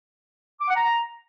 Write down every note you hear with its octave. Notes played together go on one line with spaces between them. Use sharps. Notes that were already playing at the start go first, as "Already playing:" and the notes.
D6
F#5
A#5